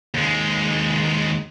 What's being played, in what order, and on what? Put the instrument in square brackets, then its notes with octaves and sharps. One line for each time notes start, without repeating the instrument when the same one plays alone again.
[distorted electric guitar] D#2 G#3